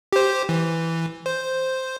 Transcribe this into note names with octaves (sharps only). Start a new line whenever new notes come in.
G4 C5
E3
C5